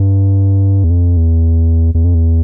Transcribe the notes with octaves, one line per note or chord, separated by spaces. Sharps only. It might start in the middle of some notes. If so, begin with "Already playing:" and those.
Already playing: G2
E2
F2
E2
E2
F2
E2